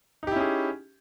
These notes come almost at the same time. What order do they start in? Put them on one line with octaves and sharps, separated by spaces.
D#4 G4 E4 C#4 G#4